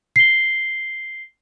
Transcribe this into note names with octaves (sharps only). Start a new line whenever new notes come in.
C7 G7